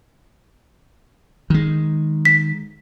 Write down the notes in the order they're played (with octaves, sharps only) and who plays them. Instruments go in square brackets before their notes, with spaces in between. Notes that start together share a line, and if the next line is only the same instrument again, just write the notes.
[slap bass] D#3 G#3
[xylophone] B6